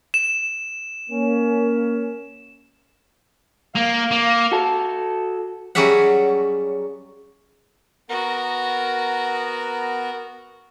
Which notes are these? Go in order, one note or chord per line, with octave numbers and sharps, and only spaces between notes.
E7
A#3 C#4
A#3 F5
A#3
F#4 A4
F#3 G3 C#4 G#4 E5 F#5
B3 F#4 A#4 A#5